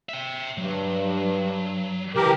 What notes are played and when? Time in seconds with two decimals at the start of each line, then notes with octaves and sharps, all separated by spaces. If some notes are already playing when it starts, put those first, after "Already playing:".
0.09 E5 G5
0.58 G2 F#3
2.15 C#3 E3 G4 A#4 A5